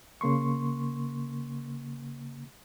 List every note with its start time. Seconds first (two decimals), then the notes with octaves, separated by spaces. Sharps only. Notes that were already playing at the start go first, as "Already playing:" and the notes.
0.21 C#3 A#3 C6 C#6